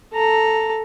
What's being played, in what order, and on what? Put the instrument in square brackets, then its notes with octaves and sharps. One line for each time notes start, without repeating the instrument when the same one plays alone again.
[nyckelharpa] A4 A#5